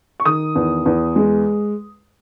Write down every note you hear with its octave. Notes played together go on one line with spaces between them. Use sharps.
C#6
D#3 D#6
E2
E2
G#3